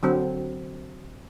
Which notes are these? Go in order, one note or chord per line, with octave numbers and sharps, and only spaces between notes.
D3 F#3 C4